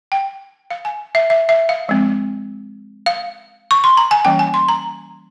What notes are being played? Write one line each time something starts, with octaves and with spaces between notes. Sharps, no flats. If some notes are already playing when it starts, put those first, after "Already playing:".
G5
F5
G#5
E5
E5
E5
F5
F3 G#3 C4
F5
C#6
C6
A#5
G#5
E3 G3 A#3 C#4 G5
G#5
C6
A#5